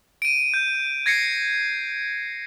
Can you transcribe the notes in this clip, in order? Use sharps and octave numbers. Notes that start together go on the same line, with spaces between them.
D7 D#7
G6
G#6 A#6 C7 C#7